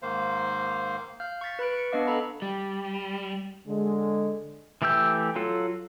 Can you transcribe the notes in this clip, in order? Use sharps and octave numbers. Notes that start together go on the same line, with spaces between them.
G#2 D#3 A#3 C5 F5
F5 F6 G6
C#6 F6 A6 B6
B4 B5 F#6 D7
C#6 C#7
B3 D4 B4 D#5 F5 D6
A4 D#5 A#5 B5
G3
D3 G#3
E3 A3 G4 E6 G6
F#3 F4 A4